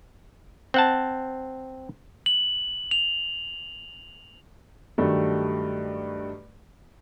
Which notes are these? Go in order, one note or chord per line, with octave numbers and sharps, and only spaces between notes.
C4 F#5 A5
F#7
F7
G2 D#3 F#3 G3 A3